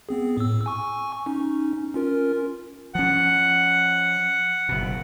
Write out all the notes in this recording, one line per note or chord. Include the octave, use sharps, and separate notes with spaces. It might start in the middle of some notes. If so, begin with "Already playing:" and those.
B3 C4 G#4
A2 E6
G#5 C#6
C#4 D#4
C#4 F4 A#4
F3 C#4 F#5
F#1 B2